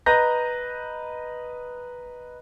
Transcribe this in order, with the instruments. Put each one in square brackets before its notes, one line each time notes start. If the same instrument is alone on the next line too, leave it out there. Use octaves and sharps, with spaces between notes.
[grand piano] B4 D#5 A#5 G6 A#6